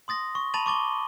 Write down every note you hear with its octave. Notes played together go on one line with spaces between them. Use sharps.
C6 D#6 A6 A#6
C#6
A5 B5 A6 D#7 F#7
C#6 D6 A6 G7